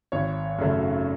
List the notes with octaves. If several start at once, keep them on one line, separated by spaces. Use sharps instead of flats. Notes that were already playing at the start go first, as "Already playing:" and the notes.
G#1 C#5
F#2 C#3 F#3 A3